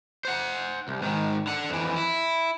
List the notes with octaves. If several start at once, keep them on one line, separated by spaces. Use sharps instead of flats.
C5 F#5
C2
G#2 D#3
D3 F#5
F2 E3
E4